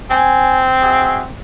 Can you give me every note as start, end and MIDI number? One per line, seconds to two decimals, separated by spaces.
0.11 1.33 60
0.11 0.61 80
0.81 1.22 66
0.81 1.22 68
0.81 1.22 76